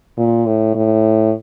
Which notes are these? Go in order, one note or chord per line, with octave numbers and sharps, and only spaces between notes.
A#2
A2
A2